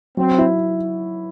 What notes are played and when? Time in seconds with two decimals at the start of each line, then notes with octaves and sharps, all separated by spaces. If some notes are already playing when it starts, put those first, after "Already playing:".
0.17 F#3 C4
0.38 E4